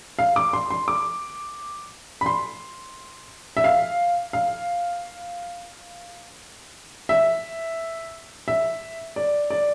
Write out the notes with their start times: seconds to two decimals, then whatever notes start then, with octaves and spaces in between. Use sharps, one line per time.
0.19 F5
0.36 D6
0.53 C6
0.71 C6
0.88 D6
2.21 B5
2.26 C6
3.57 E5
3.64 F5
4.33 F5
7.09 E5
8.48 E5
9.16 D5
9.50 D5